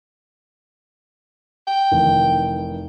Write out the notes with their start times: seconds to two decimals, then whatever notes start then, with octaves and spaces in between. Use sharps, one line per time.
1.68 G5
1.92 F1 D#3 E3